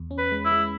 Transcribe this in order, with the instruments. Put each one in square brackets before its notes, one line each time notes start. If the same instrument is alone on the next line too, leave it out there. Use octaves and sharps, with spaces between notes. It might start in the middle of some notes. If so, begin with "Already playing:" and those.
Already playing: [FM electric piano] E2
C#4
[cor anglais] B4
[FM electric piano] G#3
[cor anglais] E4
[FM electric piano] G#3